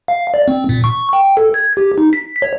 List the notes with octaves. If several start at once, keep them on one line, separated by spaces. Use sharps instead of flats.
F5
D5
C4
A#2
C#6
G5
A4
G#6
G4
D#4
B6
C#5